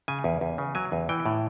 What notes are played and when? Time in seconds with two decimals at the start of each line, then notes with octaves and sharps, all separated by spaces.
0.08 C#3 G#5
0.24 E2
0.41 E2
0.58 C#3
0.75 F#3 G#5
0.92 E2
1.09 E3 G5
1.25 A2